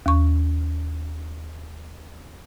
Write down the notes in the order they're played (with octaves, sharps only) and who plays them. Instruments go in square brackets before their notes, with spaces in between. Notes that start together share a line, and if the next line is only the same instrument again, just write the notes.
[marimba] D#2 C#6